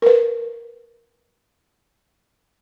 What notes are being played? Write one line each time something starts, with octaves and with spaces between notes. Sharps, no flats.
A#4 B4